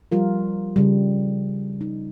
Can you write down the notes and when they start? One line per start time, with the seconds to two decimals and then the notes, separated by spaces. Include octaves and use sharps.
0.12 F3 G3 F4 A#4
0.76 C#3 G3
1.81 D#4